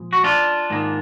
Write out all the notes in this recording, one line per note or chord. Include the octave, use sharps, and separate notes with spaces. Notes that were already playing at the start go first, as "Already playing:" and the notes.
Already playing: A#2 F3 G#3
F#4
D4 F4
G#2 D#3 A#3